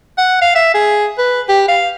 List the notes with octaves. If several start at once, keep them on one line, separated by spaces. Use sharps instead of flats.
F#5
F5
E5
G#4
B4
G4
F5